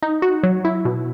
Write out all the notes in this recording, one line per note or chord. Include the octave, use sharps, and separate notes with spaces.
D#4
F#4
F#3
E4
B2